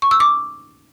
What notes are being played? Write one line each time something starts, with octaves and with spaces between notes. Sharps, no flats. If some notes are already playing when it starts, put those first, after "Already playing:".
C#6
E6
D6